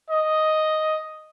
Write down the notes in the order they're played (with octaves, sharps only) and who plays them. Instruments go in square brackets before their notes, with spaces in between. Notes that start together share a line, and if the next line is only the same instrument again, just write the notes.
[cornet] D#5